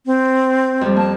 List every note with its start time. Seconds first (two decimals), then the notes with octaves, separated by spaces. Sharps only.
0.06 C4
0.81 F2 G3
0.96 A#3 A5